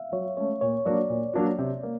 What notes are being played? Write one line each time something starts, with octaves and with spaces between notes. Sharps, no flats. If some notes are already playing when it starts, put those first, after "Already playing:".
Already playing: E5 F5
F#3 C#5
A3 C#4 C#5
A#2 C#5
F#3 A#3 D4 F#4 D5
A#2
F#3 A#3 D4 F#4
C3
A#3